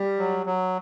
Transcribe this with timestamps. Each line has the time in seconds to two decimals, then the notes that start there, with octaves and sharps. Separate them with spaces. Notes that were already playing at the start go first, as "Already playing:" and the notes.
Already playing: G3
0.18 F#3
0.46 F#3